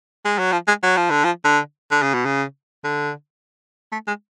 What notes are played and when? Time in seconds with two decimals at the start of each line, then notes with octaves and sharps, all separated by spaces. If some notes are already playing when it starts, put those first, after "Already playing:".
0.25 G#3
0.39 F#3
0.52 F3
0.68 G#3
0.83 F#3
0.97 F3
1.11 D3
1.24 F3
1.45 D3
1.91 D3
2.03 C#3
2.14 B2
2.25 C#3
2.84 D3
3.92 A3
4.07 G#3